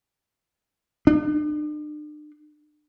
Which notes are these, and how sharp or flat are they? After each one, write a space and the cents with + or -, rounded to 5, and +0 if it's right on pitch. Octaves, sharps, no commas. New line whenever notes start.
D4 +40